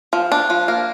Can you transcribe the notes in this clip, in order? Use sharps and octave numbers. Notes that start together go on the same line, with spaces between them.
F3
D4
F3
A#3